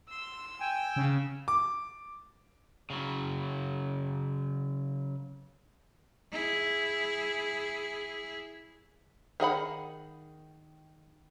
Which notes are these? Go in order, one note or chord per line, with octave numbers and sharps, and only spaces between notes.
C6 E6
G5 G#5
C#3
D6
C#3 F#3
E4 G#4
D#3 G#4 F#5 B5